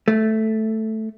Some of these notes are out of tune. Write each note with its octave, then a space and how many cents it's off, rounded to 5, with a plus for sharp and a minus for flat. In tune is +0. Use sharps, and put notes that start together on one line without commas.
A3 +0